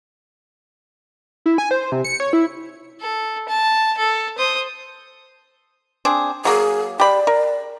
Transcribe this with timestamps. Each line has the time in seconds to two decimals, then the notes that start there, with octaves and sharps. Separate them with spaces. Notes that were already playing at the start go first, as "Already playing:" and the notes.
1.46 E4
1.58 G#5
1.71 C5
1.92 C3
2.04 C#7
2.20 C#5
2.33 E4
3.01 A4
3.48 A5
3.98 A4
4.38 C5 D#6
6.05 C4 D4 G#4
6.45 F#3 A#3 G#4
7.00 G4 D5 B5
7.27 A#4